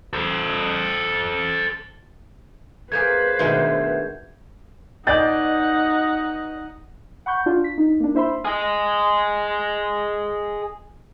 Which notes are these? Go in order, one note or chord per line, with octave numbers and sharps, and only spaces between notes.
A4 C5
A3 A#3 G#4 B4 C5 G6 G#6
B2 D#3 G#3 A3 D4
B2 D#4 D5 D#5 F#5 G#5 G6 A6
F#5 B5 C#6 G6
D4 F4
B6
D#4
A#3 D4
E4 C5 E5 B5 C6
G#4 D#5